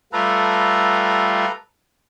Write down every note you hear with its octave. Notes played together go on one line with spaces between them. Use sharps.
G3 A3 F4 A4 B4 A#5